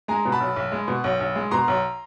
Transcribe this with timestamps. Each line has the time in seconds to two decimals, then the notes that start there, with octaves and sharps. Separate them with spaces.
0.08 G#3 G#5 A#5
0.25 B2
0.32 A5 B5
0.40 B1
0.56 B1
0.72 G#3
0.88 B2
1.04 B1
1.20 B1
1.35 G#3
1.51 B2 A#5 C6
1.68 B1